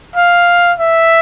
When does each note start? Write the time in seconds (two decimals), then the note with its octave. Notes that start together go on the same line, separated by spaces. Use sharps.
0.16 F5
0.79 E5